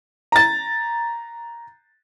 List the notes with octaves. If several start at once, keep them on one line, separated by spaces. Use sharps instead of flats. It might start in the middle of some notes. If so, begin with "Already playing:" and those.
A#5 A6